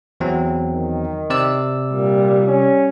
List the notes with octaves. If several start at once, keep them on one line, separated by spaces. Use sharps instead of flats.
E2 F#3 C4
D#3
C3 D5 E6
A#2 G3
C#4